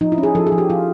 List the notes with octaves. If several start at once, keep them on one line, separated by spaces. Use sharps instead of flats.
F3 D#4
E4
C#4
G#4
F3 A4
G#4
F3
G4
F3 F4